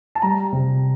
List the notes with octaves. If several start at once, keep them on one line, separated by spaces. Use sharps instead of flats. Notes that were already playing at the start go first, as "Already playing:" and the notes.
A5
G3 A#5
C3